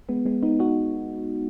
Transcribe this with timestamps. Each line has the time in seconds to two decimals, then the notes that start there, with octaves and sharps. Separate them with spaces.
0.09 G#3 B3
0.25 G#3 B3
0.43 B3 D#4
0.60 D#4 F#4